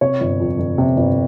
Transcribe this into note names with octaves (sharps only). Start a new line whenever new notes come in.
C3 C#5
G1
F2
G1
C3
G1